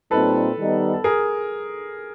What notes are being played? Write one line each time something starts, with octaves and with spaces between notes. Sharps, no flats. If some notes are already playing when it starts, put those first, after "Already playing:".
A#2 G3 C4 D#4 A4 B4
D#3 G3 B3 D#4
A4
G#4 A#4